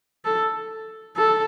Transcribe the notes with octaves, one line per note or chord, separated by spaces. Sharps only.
A4
A4